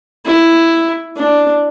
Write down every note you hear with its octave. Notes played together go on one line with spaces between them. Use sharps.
E4
D4